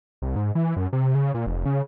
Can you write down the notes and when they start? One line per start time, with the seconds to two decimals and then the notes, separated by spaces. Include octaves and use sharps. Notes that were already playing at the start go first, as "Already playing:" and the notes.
0.22 C2
0.36 G#2
0.55 E3
0.76 F#2
0.93 C3
1.15 C#3
1.34 A#2
1.46 F1
1.65 C#3